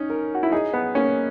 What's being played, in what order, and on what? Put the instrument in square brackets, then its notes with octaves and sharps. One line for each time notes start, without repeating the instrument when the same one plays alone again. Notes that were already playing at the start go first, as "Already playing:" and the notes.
Already playing: [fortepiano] C#4 [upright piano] D#4
[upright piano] A#4
[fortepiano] F#4
E4
[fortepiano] D#4 [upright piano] G#4
[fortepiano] B3
[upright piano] A#3 [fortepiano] C#4